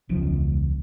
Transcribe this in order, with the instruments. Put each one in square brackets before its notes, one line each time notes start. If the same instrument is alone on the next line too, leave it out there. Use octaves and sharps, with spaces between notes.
[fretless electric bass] E1 C#2 F3